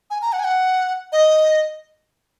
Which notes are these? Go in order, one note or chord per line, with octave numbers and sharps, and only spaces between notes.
G#5
A#5
F#5
G#5
F#5
D#5